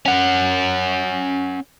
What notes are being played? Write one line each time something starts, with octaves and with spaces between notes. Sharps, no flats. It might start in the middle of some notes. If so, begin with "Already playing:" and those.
C#4 F#5